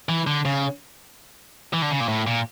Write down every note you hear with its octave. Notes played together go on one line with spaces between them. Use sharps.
E3
D3
C#3
E3
D3
C#3
A#2
A2
A#2